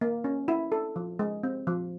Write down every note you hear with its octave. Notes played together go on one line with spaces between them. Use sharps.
A#3
C#4
E4
A4
F3
G#3
C4
F3